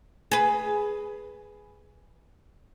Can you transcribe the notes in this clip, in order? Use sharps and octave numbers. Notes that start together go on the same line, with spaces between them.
G#4 B4